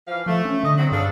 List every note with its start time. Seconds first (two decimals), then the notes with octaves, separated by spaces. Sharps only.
0.07 E3 F3 F5
0.26 F3 A3
0.45 C#4
0.63 D3 D#5
0.78 F#3 C4
0.92 G2 C#3 D4 A4